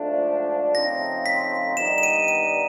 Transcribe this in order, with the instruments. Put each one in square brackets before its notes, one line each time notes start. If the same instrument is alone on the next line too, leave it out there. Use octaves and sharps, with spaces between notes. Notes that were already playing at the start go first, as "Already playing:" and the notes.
Already playing: [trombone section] G#2 F3 A3 D4
[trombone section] C#3 F3 A3 C4 D#4 [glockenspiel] A#6
[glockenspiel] B6
[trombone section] G2 D#3 G3 B3 D#4 [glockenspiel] E7
[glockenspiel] E7
D#7
D#7